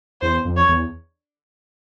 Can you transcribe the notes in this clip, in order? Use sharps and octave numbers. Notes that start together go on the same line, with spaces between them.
E2 C5
F2
C#5
E2